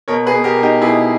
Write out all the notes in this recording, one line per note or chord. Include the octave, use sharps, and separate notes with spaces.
B2 A#4 C#5
G#4 B4
B2
G4 A#4
B2
D#4 G4
B2 E4 G#4